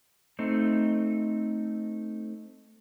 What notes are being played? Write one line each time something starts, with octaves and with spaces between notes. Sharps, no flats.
A3 C4 D#4